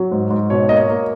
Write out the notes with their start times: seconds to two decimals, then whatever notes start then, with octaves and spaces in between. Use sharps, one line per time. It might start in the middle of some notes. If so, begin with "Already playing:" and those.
Already playing: F#3
0.12 G#2
0.30 G#2
0.50 B2 C#5
0.69 A#3 D#5
0.76 C#5
0.89 A#3